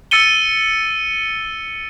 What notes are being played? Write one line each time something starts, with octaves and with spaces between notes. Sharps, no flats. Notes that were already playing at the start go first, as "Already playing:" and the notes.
E6 A6 C#7 D#7 G7